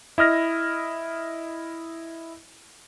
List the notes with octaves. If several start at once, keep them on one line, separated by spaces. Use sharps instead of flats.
E4 D#5 F6 A#6